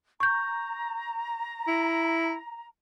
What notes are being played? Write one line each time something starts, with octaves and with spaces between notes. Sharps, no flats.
A#5 C#6 G6
E4